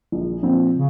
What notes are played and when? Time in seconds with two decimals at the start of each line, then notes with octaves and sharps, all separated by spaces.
0.12 A#1
0.42 A#2 F3 C4
0.72 C#3